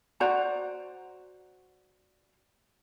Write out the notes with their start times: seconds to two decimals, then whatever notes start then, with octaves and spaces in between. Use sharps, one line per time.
0.20 F#4 C5 D5 A#5